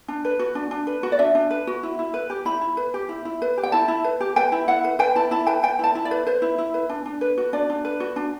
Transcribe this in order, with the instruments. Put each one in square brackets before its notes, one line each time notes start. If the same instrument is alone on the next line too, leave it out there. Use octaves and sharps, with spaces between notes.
[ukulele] D4
B4
F#4
D4
D4
B4
F#4
D5
D4 E5
D4
B4
F#4
E4
E4
B4
G4
E4 B5
E4
B4
G4
E4
E4
B4
G4
G5
E4 A5
E4
B4
G4
B4 G5
E4
E4 F#5
B4
B4 G5
E4 A5
E4 A5
B4 G5
B4 G5
E4 A5
E4
D5
B4
B4 C5
E4
E4
B4
D4
D4
B4
F#4
D4 D5
D4
B4
F#4
D4